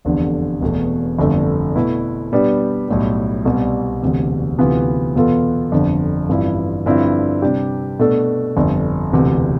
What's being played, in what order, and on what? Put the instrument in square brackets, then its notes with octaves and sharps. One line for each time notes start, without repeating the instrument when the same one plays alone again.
[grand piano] F1 E2 D3
E1 E2 B2 A3
G1 F2 D3 A3
B2 A3 E4 B4
B2 G3 B3 D4 G4
B1 A2 G3
C2 B2 G3
E1 D2 C3
D2 C3 E3 B3 F4
E2 B2 B3 F4 A4
G1 F2 D3
A1 G2 F3 C4 E4
G2 D3 F3 C4 E4
C3 G3 D4 G4
B2 A3 D4 A4
G1 F2 D3
E1 D2 C3 E3